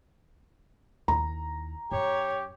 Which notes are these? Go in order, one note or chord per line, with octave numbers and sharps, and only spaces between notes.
D#2 E4 A#5
F#2 G4 C#5